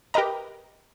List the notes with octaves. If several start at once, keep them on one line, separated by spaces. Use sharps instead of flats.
G4 A#4 B4 D#5 A#5